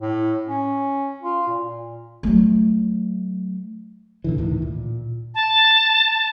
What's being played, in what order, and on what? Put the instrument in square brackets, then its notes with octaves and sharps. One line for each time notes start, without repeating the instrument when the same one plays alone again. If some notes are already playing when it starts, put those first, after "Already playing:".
[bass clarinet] A2
C#4
F4
A#2
[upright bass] F#3 A3
[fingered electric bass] A#2 D3 E3
D2 A2 D#3 E3
A#2
[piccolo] A5